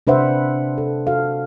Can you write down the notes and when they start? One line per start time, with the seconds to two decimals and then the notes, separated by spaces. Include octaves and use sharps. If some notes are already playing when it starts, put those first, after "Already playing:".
0.07 C3 D4 B4 C5 E5 F#5
0.78 A4
1.07 F#4 A4 F5